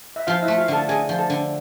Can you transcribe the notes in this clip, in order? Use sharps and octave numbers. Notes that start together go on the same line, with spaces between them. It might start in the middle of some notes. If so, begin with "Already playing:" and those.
E5
F3 F4 F5
E4 E5
A3
F4 F5
D3 A4 A5
D3 G#4 G#5
F3
A4 A5
D3